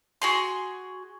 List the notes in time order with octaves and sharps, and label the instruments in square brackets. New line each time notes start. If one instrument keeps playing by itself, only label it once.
[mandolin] F#4 G#4 C6